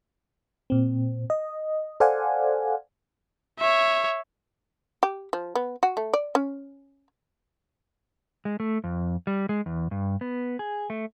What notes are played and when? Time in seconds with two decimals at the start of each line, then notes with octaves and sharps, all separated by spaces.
0.70 A#2 C4
1.30 D#5
2.00 A4 C5 D5 F5 F#5 G#5
3.59 C#5 E5
5.03 G4
5.33 F3
5.55 B3
5.83 F#4
5.97 A3
6.14 D5
6.35 C#4
8.45 G#3
8.60 A3
8.84 F2
9.27 G3
9.49 G#3
9.66 E2
9.91 G2
10.21 B3
10.59 G#4
10.90 A3